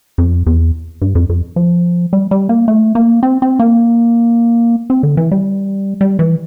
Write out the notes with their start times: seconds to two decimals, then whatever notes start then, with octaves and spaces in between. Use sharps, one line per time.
0.18 F2
0.46 E2
1.01 G2
1.15 F2
1.29 F2
1.56 F3
2.13 G3
2.31 G3
2.49 A#3
2.68 A3
2.95 A#3
3.23 C4
3.42 C4
3.59 A#3
4.90 C4
5.03 D3
5.17 E3
5.31 G3
6.01 G3
6.19 E3